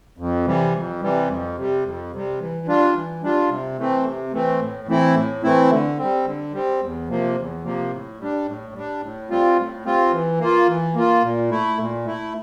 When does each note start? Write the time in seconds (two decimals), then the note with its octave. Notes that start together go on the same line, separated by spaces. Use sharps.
0.18 F2
0.45 C3 E3 G3
0.74 F2
1.01 C3 E3 G3
1.29 F2
1.57 C3 G3
1.84 F2
2.12 C3 G3
2.39 E3
2.67 G3 D4 F4
2.94 E3
3.22 G3 D4 F4
3.49 C3
3.77 E3 A3 C4
4.05 C3
4.33 E3 A3 C4
4.60 A2
4.88 E3 A3 C4 E4
5.15 A2
5.43 E3 A3 C4 E4
5.70 D3
5.98 G3 C4
6.25 D3
6.53 G3 C4
6.81 E2
7.09 C3 F3 A#3
7.36 E2
7.64 C3 F3 A#3
7.91 A2
8.19 G3 D4
8.46 A2
8.74 G3 D4
9.02 A2
9.29 G3 C4 F4
9.57 A2
9.85 G3 C4 F4
10.12 E3
10.39 A#3 F4
10.68 E3
10.95 A#3 F4
11.22 A#2
11.50 A3 E4
11.78 A#2
12.05 A3 E4